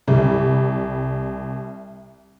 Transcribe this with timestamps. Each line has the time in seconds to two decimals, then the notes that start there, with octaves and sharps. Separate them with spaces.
0.07 C2 G3